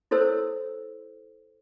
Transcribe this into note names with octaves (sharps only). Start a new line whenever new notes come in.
E4 A4 C5 C#5 E6